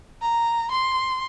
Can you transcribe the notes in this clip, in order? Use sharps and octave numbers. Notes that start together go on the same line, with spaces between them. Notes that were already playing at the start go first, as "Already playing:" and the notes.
A#5
C6